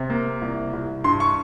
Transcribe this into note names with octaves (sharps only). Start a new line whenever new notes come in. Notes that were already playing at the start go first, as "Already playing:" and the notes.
Already playing: C3
A#3
C2
C2
G2 C6
C#6